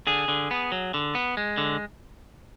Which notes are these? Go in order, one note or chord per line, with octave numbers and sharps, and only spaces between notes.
D3 G#4
D3
B3
F#3
D3
B3
G#3
D3